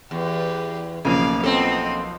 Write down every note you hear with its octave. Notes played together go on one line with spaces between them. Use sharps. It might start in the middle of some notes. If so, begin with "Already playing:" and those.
E2 G4 B4
B1 C#3 F3 A#3 D5 F5 D#7
B3 C4 A4 D#5